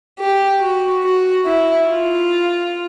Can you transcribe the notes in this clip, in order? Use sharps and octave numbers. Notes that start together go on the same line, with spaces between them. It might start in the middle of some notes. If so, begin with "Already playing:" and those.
G4
F#4
F#4
E4
F4